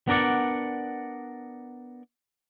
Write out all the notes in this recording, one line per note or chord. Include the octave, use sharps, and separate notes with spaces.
B3 D4 A#4 D5 F#5